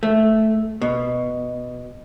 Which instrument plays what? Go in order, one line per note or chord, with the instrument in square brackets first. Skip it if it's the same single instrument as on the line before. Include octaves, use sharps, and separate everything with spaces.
[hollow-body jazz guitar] A3
B2